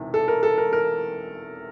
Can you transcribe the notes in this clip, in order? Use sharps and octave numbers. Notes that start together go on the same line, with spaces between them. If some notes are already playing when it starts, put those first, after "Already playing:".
Already playing: E1 E2 C3 D#3
A4
A#4
A4
A#4
A#4